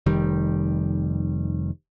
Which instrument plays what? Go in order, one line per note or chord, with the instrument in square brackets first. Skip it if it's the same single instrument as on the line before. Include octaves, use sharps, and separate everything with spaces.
[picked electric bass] F1 D#3 G3